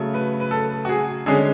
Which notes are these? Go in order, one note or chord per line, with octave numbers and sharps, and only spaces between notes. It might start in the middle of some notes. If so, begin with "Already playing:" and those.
Already playing: C#3 F#3 A3
B4
B4
A4
F#4
G#4
D3 G#3 C#4 G#4